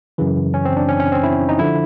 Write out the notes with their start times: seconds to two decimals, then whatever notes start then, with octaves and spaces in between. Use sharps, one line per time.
0.18 F#2 C#3 E3
0.54 C#4
0.65 C4
0.77 D4
0.89 C#4
1.00 C#4
1.12 C4
1.23 E4
1.49 D#4
1.59 D3 F3 E4